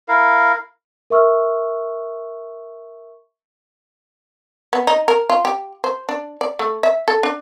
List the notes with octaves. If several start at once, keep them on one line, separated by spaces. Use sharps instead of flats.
E4 A#4 F5
A#4 E5 C#6 E6 F6
B3
D#4
A#4
F4
G4
C5
D4
D5
A3
E5
A4
D4